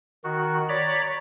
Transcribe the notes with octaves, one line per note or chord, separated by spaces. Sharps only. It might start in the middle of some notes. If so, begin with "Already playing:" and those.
D#3 F#4
C#5 D5 A#5 B5 A6